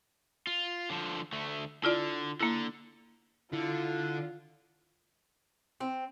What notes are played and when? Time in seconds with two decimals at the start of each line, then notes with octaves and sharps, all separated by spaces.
0.47 F4
0.90 D3 F3
1.33 D2 A3
1.84 D3 E4 F4 D5
2.41 D3 A#3 E4
3.53 D3 E4 F4
5.80 C4